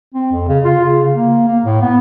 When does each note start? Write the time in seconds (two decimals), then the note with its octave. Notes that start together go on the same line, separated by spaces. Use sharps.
0.14 C4
0.32 F2
0.48 C#3
0.65 F4
0.84 C#3
1.13 A#3
1.48 A#3
1.64 A2
1.82 B3